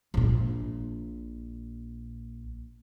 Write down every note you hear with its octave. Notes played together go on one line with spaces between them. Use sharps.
A#1 A#2